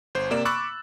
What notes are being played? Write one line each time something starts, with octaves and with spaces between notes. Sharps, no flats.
G1 C5
C3 A#3 D5 E7
B5 C#6 D6 E6 F#6 A6